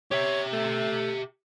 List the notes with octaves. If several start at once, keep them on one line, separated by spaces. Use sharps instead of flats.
G4 C#5 E5
A3